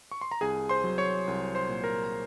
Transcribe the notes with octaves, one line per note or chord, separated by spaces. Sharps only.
C#6
C6
A#5
C2 G#4 G#5
C5 C6
F#3
C#5 C#6
C2
C5 C6
A#2
A#4 A#5
A#5